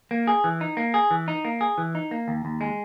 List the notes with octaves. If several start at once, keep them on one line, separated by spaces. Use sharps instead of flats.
A#3
G#4
E3
D#4
A#3
G#4
E3
D#4
A#3
G#4
E3
D#4
A#3
D#2
D#2
G#3